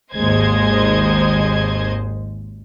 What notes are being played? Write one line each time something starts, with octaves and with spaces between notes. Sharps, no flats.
G#1 D#2 G#3 C5 D#5 G#6